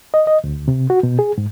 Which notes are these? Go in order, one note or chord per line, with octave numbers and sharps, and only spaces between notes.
D#5
D#5
D2
C3
F#4
B2
G#4
G#2